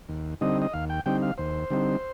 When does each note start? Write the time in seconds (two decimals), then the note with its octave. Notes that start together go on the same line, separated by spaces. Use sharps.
0.09 D#2
0.41 D3 G3 C4 D#4 D#5
0.62 D#5
0.73 D#2 F5
0.90 G5
1.06 D3 G3 C4 D#4 G5
1.22 F5
1.38 D#2 C5
1.70 D3 G3 C4 D#4